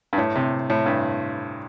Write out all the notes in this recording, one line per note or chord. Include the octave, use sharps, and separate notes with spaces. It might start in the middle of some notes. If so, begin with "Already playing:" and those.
G2
A2
C3
A2
G2